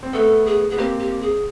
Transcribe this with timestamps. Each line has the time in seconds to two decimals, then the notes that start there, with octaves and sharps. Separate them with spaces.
0.03 C4
0.13 A3 B3 A4
0.46 G#4
0.70 B3 G#4
0.78 A#3 C4 G4
0.99 G4
1.21 G#4